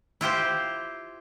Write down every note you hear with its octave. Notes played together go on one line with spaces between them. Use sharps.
E4 F4 G4 C5